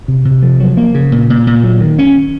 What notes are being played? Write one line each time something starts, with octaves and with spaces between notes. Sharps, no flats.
C3
C3
F3
F#3
A#3
C#3
A#2
A#2
A#2
F#3
D#3
C#4